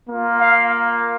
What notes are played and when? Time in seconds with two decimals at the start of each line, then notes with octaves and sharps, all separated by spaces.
0.10 A#3 F4
0.40 F5